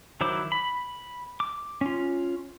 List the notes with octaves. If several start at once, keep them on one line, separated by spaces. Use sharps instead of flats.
D#3 F#3 E4 C5 D6
B5
D6
C#4 F4